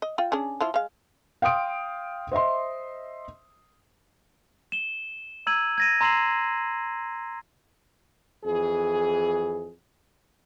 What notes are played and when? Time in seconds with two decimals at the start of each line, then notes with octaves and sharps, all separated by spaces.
0.02 D#5
0.18 F4 G5
0.32 C#4 D4 G#4
0.61 F3 E4 F4
0.74 G#3 F5
1.42 F5 G5 C6 D#6 D7
2.32 C5 D#5 E5 C6
4.72 E7 G7
5.47 A#5 E6 G#6 D#7 F#7
5.78 G#6 A#6 D#7
6.01 A#5 C6 E6 C7 E7 F#7
8.45 F2 E3 G#4